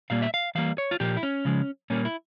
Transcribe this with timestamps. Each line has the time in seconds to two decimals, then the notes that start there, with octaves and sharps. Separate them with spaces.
0.10 A#2 G3 A#3 F5
0.22 E5
0.34 F5
0.55 E3 G3 A#3 F5
0.78 C#5
0.91 F4
1.00 A#2 F3 A#3 G4
1.17 E4
1.23 C#4
1.45 C#3 F3 G#3
1.90 A#2 G3 A#3 C#4
2.05 E4